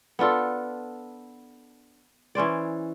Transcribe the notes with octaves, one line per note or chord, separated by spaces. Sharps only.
B3 D4 F4 A4
E3 C#4 C5 D5